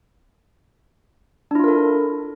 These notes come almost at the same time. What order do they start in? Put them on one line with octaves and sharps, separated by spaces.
D4 E4 F4 A#4 A4